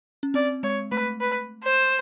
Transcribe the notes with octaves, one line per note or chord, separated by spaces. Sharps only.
C#4
C4 D5
G#3 C#5
A3 B4
B4
C5